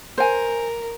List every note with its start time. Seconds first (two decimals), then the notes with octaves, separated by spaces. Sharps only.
0.18 A#4 C5 G#5